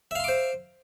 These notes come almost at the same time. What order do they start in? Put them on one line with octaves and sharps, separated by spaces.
E5 F5 C6 D6 C5